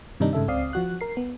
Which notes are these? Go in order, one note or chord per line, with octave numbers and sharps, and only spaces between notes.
G2 C3 D#3 G3 D4 D#4
G#2 C#3 A4 E5
C#2 C4 D5 F5 D#6 C7
F3 F#4 F#6
A#4 C7
B3